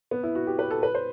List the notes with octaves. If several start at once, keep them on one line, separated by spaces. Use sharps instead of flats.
B3
E4
F#4
G4
B4
A4
B4
C5